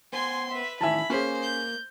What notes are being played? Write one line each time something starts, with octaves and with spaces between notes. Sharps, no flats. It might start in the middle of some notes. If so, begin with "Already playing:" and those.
B3 C5 G#5 C6
B4 E5
A2 D#3 E3 E5 G#5 A5 B5
A#3 C#4 G#4 C5
G6